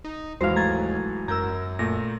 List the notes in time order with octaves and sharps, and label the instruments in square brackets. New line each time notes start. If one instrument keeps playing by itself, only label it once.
[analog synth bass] D#4
[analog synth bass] D#2 [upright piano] G#2 E3 F#3 [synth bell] C5 F5
[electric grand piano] A3 [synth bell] A#5 G#6 A6
[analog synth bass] F#2 [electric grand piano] A#4 G6 G#6 [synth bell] A#5 E6
[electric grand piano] A#2 A3 [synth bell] A#6